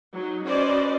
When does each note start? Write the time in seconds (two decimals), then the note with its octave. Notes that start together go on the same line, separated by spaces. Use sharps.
0.13 F#3 D#4
0.46 C#4 F#4 B4 C5 D5 D#5